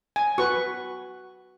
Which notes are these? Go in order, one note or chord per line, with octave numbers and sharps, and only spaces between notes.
G#5
F#4 B4 C#6